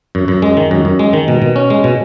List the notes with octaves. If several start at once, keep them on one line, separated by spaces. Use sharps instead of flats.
F#2
F#2
G#3
D#3
F#2
F#2
G#3
D#3
B2
B2
C#4
G#3
B2